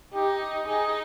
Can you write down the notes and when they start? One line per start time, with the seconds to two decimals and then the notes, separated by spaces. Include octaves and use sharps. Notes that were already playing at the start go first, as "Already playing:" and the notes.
0.14 D#4 G4
0.68 D#4 G#4